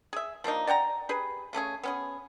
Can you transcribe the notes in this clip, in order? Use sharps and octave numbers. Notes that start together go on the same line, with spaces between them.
G#4 E5
F3 A#3 D4 D#4
D5 F#5 G5 A#5
G4 G#4 B4
C#3 A3 C#4 G#4
B3 C#4 G#4